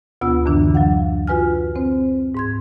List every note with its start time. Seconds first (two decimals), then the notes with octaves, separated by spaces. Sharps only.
0.21 D2 B2 B3 F4 E6
0.46 F#2 D3 E3 D4
0.75 D2 F#3 F5 F#5
1.27 F4 F#4 B4 G#5 F6
1.75 C4 C5
2.35 G#2 C6 G#6